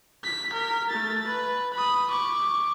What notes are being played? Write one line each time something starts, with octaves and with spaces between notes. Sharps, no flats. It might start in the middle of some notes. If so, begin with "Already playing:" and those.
B6
A#4 B6
A3 A6
B4
B5 D#6
C#6 D6